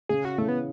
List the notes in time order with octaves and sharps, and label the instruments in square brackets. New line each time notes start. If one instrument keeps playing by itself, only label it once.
[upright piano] C#3 [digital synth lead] G#4
[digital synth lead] F#4
[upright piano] C#3 E3 [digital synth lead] A3
[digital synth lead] B3